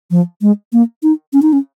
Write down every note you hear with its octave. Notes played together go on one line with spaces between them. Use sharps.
F3
G#3
A#3
D#4
C#4
D#4
C#4